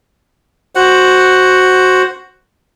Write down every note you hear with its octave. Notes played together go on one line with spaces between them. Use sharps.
F#4 C5 F#5